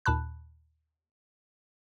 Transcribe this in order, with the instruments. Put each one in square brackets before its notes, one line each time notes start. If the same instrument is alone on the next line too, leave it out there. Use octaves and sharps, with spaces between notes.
[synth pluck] D#2 A#2 A5 B5 F#6